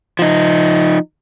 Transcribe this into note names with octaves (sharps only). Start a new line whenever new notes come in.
F3 D#4